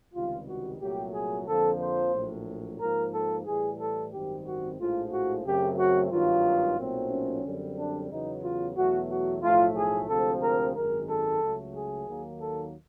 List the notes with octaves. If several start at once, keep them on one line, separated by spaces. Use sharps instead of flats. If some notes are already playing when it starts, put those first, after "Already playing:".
C#2 C3 D#3 G3 F4
F#4
C2 A#2 F#3 A3 G4
G#4
F2 D3 F3 A#3 A4
C5
A#1 A2 F#3
G#2 F3 A#3 A#4
A4
A2 E3 G3 G#4
A4
G#1 F#2 D#3 G3 C4 G4
F#4
A#1 A2 F3 G#3 F4
F#4
F#2 C#3 F#3 A3 C4 G4
F#4
G#1 G2 D#3 F#3 F4
B1 A#2 F#3 A3 C4
C#4
F#2 D3 G3 C4
D4
E2 C#3 F#3 B3 D#4
F4
E2 B2 F#3 A3 F#4
F#4
B1 A2 F3 A3 F4
G#4
D2 C3 F3 G#3 C4 A4
A#4
G#1 F#2 D#3 G#3 A#4
A4
C#2 C#3 F#3 A3
G#4
D#2 D#3 F#3 A#3
A4